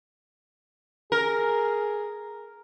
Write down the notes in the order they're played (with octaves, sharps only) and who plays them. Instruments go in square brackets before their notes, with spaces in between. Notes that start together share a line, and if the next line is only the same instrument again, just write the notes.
[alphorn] G#4 [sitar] A#4